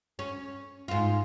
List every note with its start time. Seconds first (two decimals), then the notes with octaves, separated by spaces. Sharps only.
0.19 C#4
0.88 G#2 F4